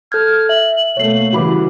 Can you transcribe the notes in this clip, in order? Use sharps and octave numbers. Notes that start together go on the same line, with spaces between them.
A4 F6 G6 G#6
E5 F#7
B2 A3 A#3 C#5 C7
C#3 E3 G3 F#4 B5 D6